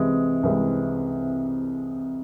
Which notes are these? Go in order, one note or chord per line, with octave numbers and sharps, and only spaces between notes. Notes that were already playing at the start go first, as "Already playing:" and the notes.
Already playing: C2 C3 E3 G#3
C2 C3 E3 G#3